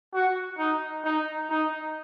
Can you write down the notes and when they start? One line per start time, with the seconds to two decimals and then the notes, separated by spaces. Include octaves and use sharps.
0.13 F#4
0.58 D#4
1.04 D#4
1.50 D#4